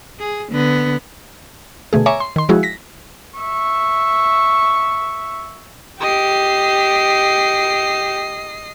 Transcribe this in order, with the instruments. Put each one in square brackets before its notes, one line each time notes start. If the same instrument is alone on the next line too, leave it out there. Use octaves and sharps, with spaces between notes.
[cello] G#4
D3 B3
[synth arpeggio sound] B2 D3 A3 G#4
C#5 E5 G#5 A#5 C#6 D6
C6
D#3 C6
F3 G#3 E4 F#4 G#4
A#6 B6
[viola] E5 C#6
[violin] G4 [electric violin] D#5 C7